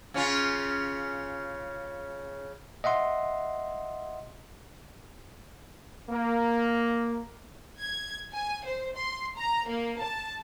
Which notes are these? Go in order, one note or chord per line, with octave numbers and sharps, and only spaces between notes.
C#3 C#4 F4
D#5 E5 F#5 C6
A#3
G#6
G#5
C5
C6
A#5
A#3
A5